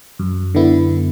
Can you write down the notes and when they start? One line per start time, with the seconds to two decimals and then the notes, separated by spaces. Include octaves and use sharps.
0.19 F#2
0.54 D3 B3 E4